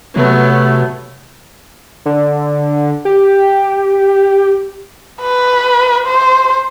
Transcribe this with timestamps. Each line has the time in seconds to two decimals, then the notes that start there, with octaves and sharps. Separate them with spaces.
0.16 C3 F#3 A3 B3
2.06 D3
3.05 G4
5.21 B4
6.06 C5